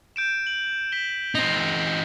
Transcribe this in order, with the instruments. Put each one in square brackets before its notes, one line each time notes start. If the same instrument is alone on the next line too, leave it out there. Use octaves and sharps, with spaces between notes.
[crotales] G6 D7 E7
F#7
B6 E7 G7
[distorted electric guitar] C4 D#4 [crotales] A#6